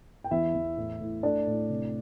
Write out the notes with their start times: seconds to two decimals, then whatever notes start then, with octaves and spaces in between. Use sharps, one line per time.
0.24 G5
0.31 E2 E4 E5
0.54 E2
0.77 A2
1.00 A2
1.23 A3 D4 D5
1.47 A2
1.70 C3